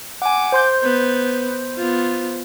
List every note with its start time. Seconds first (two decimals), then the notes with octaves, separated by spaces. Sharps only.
0.22 F#5 G#5 D6
0.52 C5 C6 G6
0.82 B3 B4
1.77 B3 F4